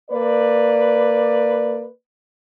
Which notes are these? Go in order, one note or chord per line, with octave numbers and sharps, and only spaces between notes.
A#3 B4 D5